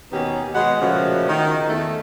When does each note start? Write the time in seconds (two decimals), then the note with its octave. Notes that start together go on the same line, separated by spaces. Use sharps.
0.11 D#2 B2 B3 C#4 D#4 G4
0.55 B2 G#3 F#5
0.81 A#2 C#3 F3 A3 C#4 F#4
1.29 D#3
1.68 E2 A3 A4